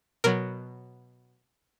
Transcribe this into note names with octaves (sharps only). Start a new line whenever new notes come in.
B2 F#3 A#4